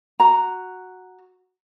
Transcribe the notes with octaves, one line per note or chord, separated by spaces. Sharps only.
F#4 A#5